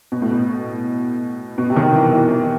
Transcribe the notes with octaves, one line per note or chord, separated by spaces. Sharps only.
B2
A2
B2
B2
C3
D#3
E3
E3
E3